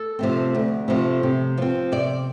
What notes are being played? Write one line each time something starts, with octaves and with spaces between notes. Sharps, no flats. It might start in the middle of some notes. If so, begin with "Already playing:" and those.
Already playing: A4
C3 F3 A3 C4
D2
C3 F3 A3 C4
C3
F3 C4
C3 D5